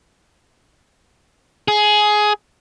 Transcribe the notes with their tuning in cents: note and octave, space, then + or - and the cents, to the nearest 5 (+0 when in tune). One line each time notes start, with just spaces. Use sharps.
G#4 +15